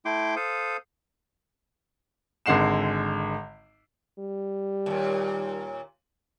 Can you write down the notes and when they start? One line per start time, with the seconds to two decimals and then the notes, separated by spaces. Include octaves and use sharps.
0.05 A3 E4 G5 C6 D6
0.36 A4 C5 F5 D#6
2.46 G#1 D3 G#3 F#5 C7 E7
4.19 G3
4.86 D#2 A#2